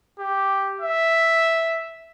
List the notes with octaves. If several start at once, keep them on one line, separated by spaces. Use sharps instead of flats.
G4
E5